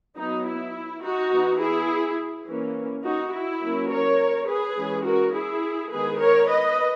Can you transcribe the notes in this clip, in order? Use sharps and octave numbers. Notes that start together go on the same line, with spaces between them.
F#3 B3 D#4
E4
D#4 F#4
E3 B3
E4 G#4
E3 A#3 C#4
D#4 F#4
E4
F#3 A#3 C#4
A#4 C#5
G#4 B4
E3 G#3 C#4
F#4 A#4
E4 G#4
D#3 G#3 B3 G#4 B4
A#4 C#5
B4 D#5